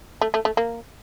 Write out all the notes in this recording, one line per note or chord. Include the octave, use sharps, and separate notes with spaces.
A3
A3
A3
A#3